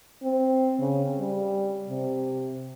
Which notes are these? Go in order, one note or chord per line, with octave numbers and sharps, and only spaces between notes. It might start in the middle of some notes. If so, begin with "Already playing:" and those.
C4
C#3
G3
C3